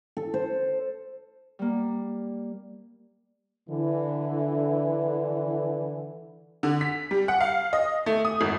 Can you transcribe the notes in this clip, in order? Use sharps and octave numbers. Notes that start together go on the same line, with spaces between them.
A4
C5
G3 A#3
D3 E3
D3
B6
G3
F#5
F5
D#5
A3
D#6
G#1